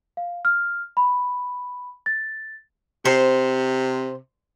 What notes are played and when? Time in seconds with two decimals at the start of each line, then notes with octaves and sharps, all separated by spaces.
0.17 F5
0.45 F6
0.97 B5
2.06 A6
3.05 C3 C5